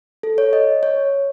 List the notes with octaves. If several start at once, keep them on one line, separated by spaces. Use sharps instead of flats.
A4
C#5
D#5
C#5